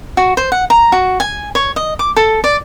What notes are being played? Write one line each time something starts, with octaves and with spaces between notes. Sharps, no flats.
F#4
C5
F#5
A#5
F#4
G#5
C#5
D#5
D6
A4
D5